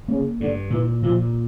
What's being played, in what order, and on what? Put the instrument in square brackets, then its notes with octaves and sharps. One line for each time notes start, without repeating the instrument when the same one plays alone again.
[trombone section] C#3 [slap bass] A#3
[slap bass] G2 [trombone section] D3
[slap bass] A#2 [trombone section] E3
[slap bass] A#2 [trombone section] F3